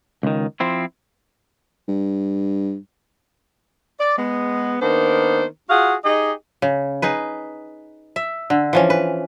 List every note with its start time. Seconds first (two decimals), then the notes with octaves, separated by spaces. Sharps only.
0.23 C#2 D#3
0.60 F3 C4 E4
1.88 G2
4.00 D5
4.18 G#3 B3
4.82 D#3 A#3 B3 D4 C5
5.70 F4 F#4 G#4 F5 F#5
6.05 D#4 G4 G#4 D#5
6.62 C#3
7.02 D#4 G#4 B4
8.16 E5
8.50 D3
8.73 E3 F3 C#4
8.90 B4